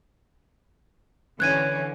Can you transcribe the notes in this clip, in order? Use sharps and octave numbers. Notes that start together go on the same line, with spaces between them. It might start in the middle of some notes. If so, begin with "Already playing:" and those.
D3 E3 C#4 F#6 G#6 D#7